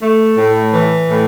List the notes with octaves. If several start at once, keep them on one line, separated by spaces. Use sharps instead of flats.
A3
A2
E3
A2